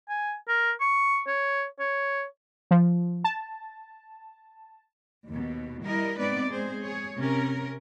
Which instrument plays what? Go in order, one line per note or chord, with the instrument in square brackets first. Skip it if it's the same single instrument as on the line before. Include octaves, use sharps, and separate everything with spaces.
[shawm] G#5
A#4
C#6
C#5
C#5
[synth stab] F3
A5
[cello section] D#2 B2
G3 E4 A#4 D#5
G#3 B3 C4 D#4 B4 D5
G#3 C4 G#4 C5
G#4 C#5
C3 C#4 A#4